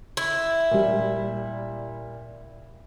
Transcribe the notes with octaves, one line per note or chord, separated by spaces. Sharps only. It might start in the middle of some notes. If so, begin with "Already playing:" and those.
E4
A#2 G3